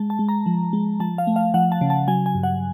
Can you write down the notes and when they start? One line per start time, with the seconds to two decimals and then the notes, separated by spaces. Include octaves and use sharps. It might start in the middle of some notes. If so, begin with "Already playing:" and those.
Already playing: G#3 A5
0.10 A5
0.19 G#3
0.29 A#5
0.46 F3
0.73 G#3
1.00 F3 A5
1.18 F5
1.27 A3
1.36 F5
1.54 F3 F#5
1.72 A5
1.81 C#3
1.90 A5
2.08 F#3 G#5
2.26 G#5
2.35 G2
2.43 F#5